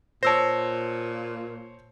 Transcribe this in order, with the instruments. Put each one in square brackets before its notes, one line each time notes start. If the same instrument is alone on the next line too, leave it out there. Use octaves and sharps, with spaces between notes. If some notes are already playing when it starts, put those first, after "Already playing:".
[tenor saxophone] A#2 [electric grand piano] C5 C#5 [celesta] A5 E6 A#6